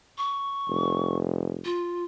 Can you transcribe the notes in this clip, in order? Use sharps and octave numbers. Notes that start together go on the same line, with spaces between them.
C#6
F1
F4